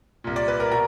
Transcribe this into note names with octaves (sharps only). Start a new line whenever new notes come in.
C2 A#2
D5
B4
A#4
B2 A#4